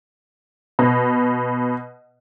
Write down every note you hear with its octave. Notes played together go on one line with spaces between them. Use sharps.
B2